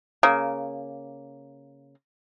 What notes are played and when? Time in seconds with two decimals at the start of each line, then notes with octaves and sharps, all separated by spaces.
0.23 C#3 A#3